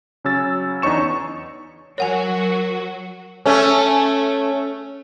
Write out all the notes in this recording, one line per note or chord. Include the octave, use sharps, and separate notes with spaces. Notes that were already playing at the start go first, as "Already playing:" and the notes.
C#3 F#3 C#4 E6 A6
E2 D4 D#4 C#5 C#6 E7
F#3 F#4 A#4 C#5 F#5 G#5
A3 C#4